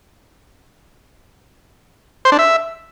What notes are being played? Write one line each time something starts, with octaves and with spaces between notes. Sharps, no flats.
C5
D4
E5